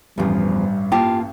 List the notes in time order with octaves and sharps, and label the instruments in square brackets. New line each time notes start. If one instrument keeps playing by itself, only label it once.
[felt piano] A1 G2 [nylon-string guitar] E2 F3 [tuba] G3
[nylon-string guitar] A#3 F4 A5 [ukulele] G4